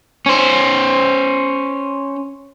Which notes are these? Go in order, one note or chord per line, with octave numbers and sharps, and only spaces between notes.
C#4 C5